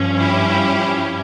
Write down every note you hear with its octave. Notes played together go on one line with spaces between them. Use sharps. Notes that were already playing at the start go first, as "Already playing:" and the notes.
Already playing: G2 F3 C#4
E4 G4